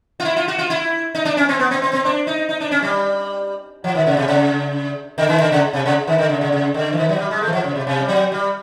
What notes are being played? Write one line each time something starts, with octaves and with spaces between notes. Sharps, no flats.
F4
E4
F4
F#4
F4
E4
D#4
D4
C#4
C4
B3
C4
C4
C4
D4
D#4
D#4
D4
C#4
G3
F3
D#3
C#3
C3
C#3
D3
D#3
D3
C#3
C3
C#3
D#3
D3
C#3
C#3
C#3
D3
E3
D#3
F#3
G3
G#3
A3
E3
F3
C#3
C3
C3
G3
F#3
G3